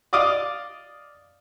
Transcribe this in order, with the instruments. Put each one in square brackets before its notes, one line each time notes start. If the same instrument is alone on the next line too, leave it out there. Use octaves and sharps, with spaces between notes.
[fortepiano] D5 D#5 F5 D6 D#6